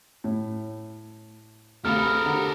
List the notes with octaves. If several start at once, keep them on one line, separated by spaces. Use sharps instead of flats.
A2
D2 C3 A4 A#4 F5 B5 D#6 F6
D3 G4